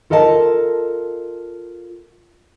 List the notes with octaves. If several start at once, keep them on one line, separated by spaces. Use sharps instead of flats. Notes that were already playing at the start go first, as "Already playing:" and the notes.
F4 A4 A#4 D#5 E5 A5